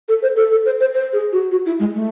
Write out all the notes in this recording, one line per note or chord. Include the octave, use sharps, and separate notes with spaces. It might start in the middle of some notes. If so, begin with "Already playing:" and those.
A4
C5
A4
A4
C5
C5
C5
G#4
F#4
F#4
E4
G#3
A3